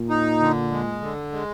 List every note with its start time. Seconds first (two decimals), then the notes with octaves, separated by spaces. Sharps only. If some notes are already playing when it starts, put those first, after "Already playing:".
Already playing: A#2
0.10 D#4
0.40 D3
0.71 G#3
1.01 D3
1.32 G#3